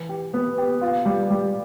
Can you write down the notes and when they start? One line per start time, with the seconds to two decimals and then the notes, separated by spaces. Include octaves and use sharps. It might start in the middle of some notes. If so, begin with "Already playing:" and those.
Already playing: E3
0.09 G4
0.34 B3
0.58 G4
0.81 F4
1.05 G3
1.30 G3